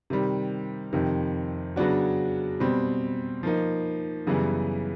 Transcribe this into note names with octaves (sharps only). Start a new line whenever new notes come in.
C3 D#3 G3
F2 C3 D#3
C#3 F#3 B3 D4 F#4
B2 G3 C4
F3 A#3 D#4
F#2 C#3 E3 G3 B3